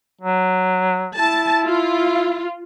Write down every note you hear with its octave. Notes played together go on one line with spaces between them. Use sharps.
F#3
E4 A5
F4